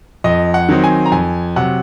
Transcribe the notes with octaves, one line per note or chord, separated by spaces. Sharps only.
F2 D#5
F#5
D#3 F#3 C4 D#4
G#5
A#5
F2 G#5
C3 F#3 F#5